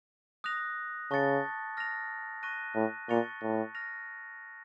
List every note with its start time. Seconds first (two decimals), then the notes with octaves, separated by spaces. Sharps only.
0.44 D#6 F#6 A#6 F7
1.10 C#3 A5 C#6 A6 C#7
1.77 F6 A#6 F7
2.43 C#6 F#6 A#6 D#7
2.75 A2
3.09 A#2 C#6 A6 C#7 F7
3.42 A2
3.75 F6 A#6 F7